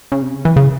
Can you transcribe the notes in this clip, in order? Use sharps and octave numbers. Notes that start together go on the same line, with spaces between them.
C#3
C3
C#3
E3
C#3